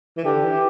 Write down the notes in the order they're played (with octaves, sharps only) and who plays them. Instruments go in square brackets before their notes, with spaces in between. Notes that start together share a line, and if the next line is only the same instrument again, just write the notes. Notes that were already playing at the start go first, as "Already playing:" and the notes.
[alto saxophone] E3
[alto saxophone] D3 [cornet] G4
[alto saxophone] E3